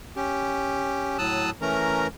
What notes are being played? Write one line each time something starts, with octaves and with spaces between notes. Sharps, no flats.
C#4 G4
A2 F#3 A5 D#6 E6 F#6
E3 A3 C#4 A#4 A#5